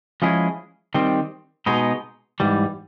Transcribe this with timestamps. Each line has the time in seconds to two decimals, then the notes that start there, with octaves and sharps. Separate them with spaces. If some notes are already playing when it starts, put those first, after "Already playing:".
0.22 F3 G#3 C#4 E4 G#4
0.94 D#3 G3 C4
1.66 B2 G#3 B3 D#4
2.40 G#2 E3 G3